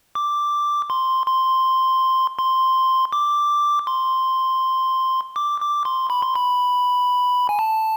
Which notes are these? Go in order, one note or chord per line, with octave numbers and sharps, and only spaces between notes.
D6
C6
C6
C6
D6
C6
D6
D6
C6
B5
C6
B5
G#5
A5